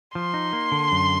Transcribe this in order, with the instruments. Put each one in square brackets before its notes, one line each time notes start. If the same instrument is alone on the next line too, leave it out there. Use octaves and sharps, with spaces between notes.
[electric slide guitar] F3 [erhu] C6
[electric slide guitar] D#4
A#3
D3
F#2